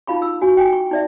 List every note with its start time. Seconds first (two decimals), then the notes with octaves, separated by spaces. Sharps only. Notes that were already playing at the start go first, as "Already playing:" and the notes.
0.07 D#4 F4 F5 B5 C#6
0.22 E6
0.41 F#4 G#5
0.57 G5 G#5
0.73 C#6
0.91 D#4 D5 E5